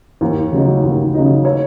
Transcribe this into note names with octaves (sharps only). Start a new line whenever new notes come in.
D#2
C#3 F#3 D#4
D#2
C#3 F#3 D#4
C#5